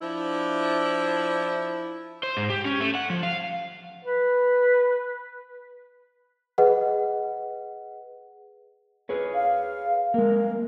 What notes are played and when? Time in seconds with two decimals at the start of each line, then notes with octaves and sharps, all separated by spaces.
0.01 F3 D4 E4
2.23 C5
2.37 G#2
2.50 G4
2.65 C#4
2.81 A3
2.95 F#5
3.10 F3
3.23 F5
4.05 B4
6.58 G#4 B4 D#5 F#5
9.09 G#4 B4 C#5
9.35 F5
10.14 G#3 A#3 A#4